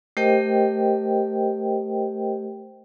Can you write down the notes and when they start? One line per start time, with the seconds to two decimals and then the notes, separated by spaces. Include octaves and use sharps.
0.17 A3 G4 A#4 C5 D#5 G5